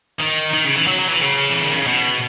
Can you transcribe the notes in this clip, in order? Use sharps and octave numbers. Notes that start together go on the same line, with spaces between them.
D#3
D#3
C#3
E3
F#3
F#3
E3
C#3
E3
D#3
C#3
B2